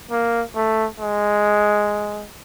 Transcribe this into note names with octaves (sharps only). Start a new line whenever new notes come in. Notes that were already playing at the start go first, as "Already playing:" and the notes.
A#3
A3
G#3